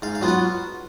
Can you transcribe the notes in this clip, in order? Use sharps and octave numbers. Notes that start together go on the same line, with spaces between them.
G#2 F5
F5
F#3 B3 F4
F#5